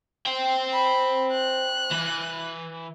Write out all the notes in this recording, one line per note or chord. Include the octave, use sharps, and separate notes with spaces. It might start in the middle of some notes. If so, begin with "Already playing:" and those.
C5 G5
B5
F#6
E3